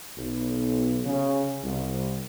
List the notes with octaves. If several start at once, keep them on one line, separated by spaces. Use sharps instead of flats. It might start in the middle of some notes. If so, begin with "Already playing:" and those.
B1
C#3
C2